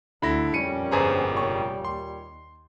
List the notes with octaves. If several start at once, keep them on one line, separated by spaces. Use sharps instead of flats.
D2 D3 E4 B5 A#6
F2 A#2 G3 C#4 C#7 D#7
G1 G#4 B4 C5 G#5 A#5
F1 C#5 C#6
D#2 C6